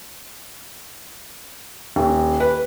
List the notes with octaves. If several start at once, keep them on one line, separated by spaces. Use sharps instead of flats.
D#1
B4